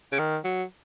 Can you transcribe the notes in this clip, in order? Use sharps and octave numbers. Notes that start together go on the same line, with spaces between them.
C#3
D#3
F#3